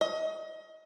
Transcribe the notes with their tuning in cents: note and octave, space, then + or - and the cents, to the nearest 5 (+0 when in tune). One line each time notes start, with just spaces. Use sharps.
D#5 +30